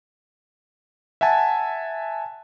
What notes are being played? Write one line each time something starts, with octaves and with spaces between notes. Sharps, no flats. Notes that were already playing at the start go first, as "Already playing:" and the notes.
E5 F#5 G#5 A5